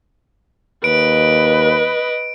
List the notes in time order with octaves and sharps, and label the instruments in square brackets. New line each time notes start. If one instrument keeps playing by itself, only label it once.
[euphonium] D#2 [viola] B4 D#5 [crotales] D7